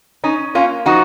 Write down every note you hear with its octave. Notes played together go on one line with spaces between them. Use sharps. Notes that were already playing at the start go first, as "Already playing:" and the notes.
C#4 D#4
A#3 C#4 F4
F3 D#4 F#4